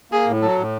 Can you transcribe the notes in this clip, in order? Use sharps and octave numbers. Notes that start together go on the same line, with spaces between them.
A#3 G#4
A2
F#3 A4
A2